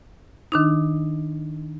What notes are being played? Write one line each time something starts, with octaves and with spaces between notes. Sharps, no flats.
D#3 D4 D#4